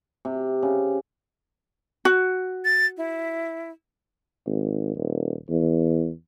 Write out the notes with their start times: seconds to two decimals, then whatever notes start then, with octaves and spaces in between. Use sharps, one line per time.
0.25 C3
0.62 C#3
2.05 F#4
2.65 A6
2.97 E4
4.46 G#1
4.96 D#1
5.49 E2